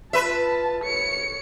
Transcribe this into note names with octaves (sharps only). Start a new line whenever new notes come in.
F4 B4 E5 A5
C#5 C#7